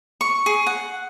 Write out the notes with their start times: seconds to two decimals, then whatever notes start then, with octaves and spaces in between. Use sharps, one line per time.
0.21 C#6
0.46 G#4
0.66 F#5